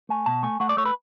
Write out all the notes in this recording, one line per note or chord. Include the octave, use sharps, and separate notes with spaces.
A3 G#5
B2 A5
A3 G#5
A3 F#5
D5
A3 C#5
B4